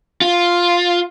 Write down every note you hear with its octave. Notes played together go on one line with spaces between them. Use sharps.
F4